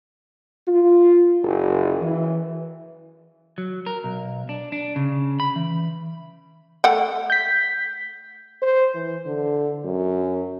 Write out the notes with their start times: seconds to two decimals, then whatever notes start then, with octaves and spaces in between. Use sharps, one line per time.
0.67 F4
1.44 F#1
2.01 E3
3.58 F#3
3.86 A#4
4.04 B1
4.49 D4
4.72 D4
4.96 C#3
5.40 B5
5.56 E3
6.84 A3 F#5 G5
7.30 G6 B6
8.62 C5
8.95 E3
9.26 D3
9.85 F#2